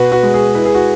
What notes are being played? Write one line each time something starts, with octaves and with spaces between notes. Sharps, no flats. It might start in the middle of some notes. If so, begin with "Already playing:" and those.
Already playing: B2 F#4 B4
F#4 B4
G#3
G#4
E4 B4
G#4
F#4